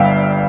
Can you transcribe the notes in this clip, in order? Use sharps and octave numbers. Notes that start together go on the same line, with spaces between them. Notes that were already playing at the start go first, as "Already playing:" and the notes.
Already playing: G1 G2 E5 F5 G5